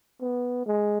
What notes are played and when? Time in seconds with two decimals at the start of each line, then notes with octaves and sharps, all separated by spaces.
0.21 B3
0.66 G#3